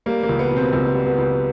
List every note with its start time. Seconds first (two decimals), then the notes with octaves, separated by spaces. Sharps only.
0.06 G3 A#3
0.23 A#3
0.29 C#2
0.39 B3
0.51 B2
0.56 C4
0.73 C#2 B3
0.95 G3
1.06 B3
1.18 C#2